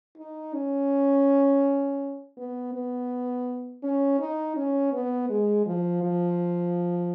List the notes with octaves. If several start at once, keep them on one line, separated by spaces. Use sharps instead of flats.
D#4
C#4
B3
B3
C#4
D#4
C#4
B3
G#3
F3
F3